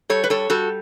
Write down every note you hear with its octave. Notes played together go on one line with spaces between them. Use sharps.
G3 A4 C#5
B4
G3 A4 C#5
G3 F#4 A4